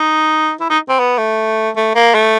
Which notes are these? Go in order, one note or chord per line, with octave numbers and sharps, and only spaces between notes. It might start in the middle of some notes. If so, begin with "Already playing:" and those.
Already playing: D#4
E4
D#4
C4
B3
A3
A3
A#3
A3